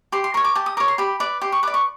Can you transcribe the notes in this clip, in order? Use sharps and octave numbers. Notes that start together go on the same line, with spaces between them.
G4 C6
C6
A#4 C#5 C#6
D6
G4 A5
D#6
A#4 C#5 D6
C6
G4 B5
B4 D5
G4 C6
C#6
B4 D5 D6
C#6